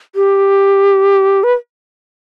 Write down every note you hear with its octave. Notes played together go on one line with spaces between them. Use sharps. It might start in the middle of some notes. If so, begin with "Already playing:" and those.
G4
B4